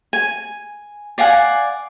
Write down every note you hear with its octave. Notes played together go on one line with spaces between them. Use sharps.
G#5
D5 F5 F#5 G#5